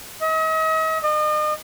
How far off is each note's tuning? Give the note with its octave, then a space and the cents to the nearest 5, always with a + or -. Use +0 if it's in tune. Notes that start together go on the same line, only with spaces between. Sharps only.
D#5 +40
D#5 -40